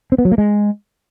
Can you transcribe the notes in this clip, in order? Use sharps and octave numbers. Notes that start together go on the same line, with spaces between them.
C4
B3
F#3
A#3
G#3